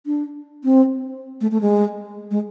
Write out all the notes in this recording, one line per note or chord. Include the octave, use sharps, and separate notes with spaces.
D4
C4
A3
A3
G#3
G#3